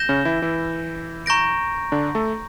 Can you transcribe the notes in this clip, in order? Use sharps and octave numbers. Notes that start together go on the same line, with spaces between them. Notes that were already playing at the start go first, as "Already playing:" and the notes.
Already playing: G6 A#6 E7 G7
C#3 C#4
E3 E4
E3 E4
A#5 C#6 G6 A#6 D7
D3 D4
A3 A4